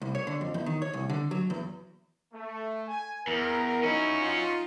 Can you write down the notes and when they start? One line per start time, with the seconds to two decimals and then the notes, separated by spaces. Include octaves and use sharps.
0.02 C2
0.15 C#5
0.27 D3
0.41 F2
0.54 E2
0.66 D#3
0.82 C#5
0.93 C2
1.10 D3
1.31 F#3
1.50 E2
2.34 A3
2.88 G#5
3.27 E2 A#4
3.83 C#4 D#4 E4 F#4
4.21 D#4 F4